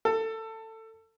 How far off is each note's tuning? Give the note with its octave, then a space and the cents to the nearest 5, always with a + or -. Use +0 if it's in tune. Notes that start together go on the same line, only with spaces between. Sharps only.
A4 +20